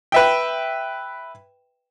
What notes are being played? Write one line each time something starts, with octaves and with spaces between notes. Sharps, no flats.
B4 E5 G5